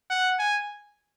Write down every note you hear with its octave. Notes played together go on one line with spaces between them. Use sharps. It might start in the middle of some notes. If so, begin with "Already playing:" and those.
F#5
G#5